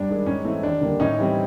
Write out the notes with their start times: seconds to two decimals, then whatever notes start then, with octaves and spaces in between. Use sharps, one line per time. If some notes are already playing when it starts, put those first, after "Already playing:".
Already playing: G2 D4
0.09 D#3 G#3
0.26 G#2 C#4
0.45 E3 A3 C4
0.63 D#2 D4
0.81 D3 G3 A#3
1.00 A2 C#4 D#4
1.18 E3 G3 C4